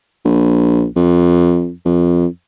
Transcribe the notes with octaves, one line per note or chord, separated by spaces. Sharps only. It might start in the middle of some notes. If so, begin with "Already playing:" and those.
A#1
F2
F2